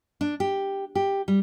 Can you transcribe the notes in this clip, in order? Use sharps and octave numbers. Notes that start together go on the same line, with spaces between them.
D4
G4
G4
G3